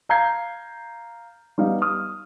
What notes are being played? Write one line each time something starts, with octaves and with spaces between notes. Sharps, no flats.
F5 A#5 G6 G#6 C7
G3 B3 D#4 F5
D#6 F6